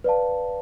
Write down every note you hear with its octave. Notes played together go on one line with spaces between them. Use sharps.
B4 D5 F5 A5